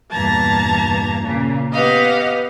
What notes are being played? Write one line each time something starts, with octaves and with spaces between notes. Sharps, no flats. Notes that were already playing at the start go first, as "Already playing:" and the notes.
E2 G2 A#2 A5 A#5 G#6
A#2 C#3
B3 G4 B4 D#5 F5 F#5